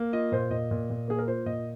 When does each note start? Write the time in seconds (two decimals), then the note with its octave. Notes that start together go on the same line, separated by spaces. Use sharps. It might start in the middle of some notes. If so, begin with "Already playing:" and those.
Already playing: A#3
0.13 F4 D#5
0.32 A#2 C5
0.51 A#2 D#5
0.71 A#2
0.90 A#2
1.08 A#3 G#4
1.19 A#4
1.27 F4 C5
1.46 A#2 D#5